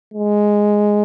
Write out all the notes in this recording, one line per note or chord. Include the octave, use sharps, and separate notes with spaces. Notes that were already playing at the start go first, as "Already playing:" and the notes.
G#3